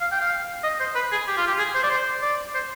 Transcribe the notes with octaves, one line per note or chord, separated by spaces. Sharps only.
F5
G5
F5
D#5
C5
B4
G#4
G4
F4
G4
G#4
C5
D5
C5
D5
C5